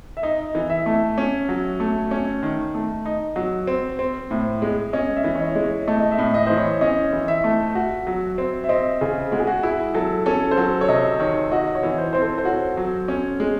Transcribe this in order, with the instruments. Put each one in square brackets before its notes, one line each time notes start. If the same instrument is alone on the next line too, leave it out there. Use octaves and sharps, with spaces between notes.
[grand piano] E5
[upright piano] D#4 [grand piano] D#5
[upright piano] E3
[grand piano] E5
[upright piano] A3
C#4
F#3
A3
C#4
D#3
A3
D#4
F#3
C4
C4
A2
G#3
[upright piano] C#4 [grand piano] D#5
[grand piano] E5
[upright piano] E3
[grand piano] C#5
D#5
[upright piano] G#3
[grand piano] C#5
[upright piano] A3 [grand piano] D#5
[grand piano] D#5
E5
[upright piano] A2
[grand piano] D#5
[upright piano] E3 [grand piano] C5
[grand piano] C#5
[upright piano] C#4 [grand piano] D#5
[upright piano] E3
[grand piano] E5
[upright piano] A3
F#4
F#3
C4
[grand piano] E5
[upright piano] C4 [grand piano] D#5
[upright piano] C#3 [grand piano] G#4
[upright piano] G#3 [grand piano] F#4
[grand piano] G#4
F#4
[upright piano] E4 [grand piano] G#4
[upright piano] F#3 [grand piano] A4
[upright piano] C#4 [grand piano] A4
[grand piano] C5
[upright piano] F#3 [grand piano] A4
[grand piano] C#5
[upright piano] C3 [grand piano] D#5
[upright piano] D#3 [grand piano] C#5
[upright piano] F#4 [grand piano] D#5
[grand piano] C#5
[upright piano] E3
[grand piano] C5
[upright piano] C4 [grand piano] C5
[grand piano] A4
C5
[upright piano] F#4 [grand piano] C#5
[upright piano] F#3
C#4
G#3